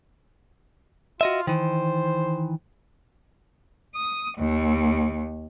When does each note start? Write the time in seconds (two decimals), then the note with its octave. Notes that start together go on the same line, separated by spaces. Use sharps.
1.21 F4 F#4 D#5 E5
1.47 D#3 E3 C5
3.95 D#6
4.38 D#2